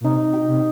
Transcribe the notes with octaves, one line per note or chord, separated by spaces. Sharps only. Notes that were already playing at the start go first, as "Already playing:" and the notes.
A#2
C3 D#4
G4
C3